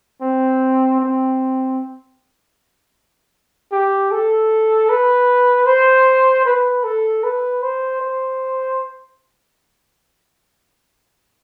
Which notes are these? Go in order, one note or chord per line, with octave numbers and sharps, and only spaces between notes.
C4
C4
G4
A4
B4
C5
B4
A4
B4
C5
C5